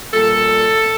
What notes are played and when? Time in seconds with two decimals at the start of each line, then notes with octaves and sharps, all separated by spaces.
0.13 A#2 G3 A#3 A4